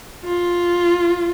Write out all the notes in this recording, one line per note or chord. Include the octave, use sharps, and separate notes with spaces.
F4